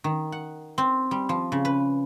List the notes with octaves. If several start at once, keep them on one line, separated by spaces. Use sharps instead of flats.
D#3
F#5
C4
G3
F3
C#3
B4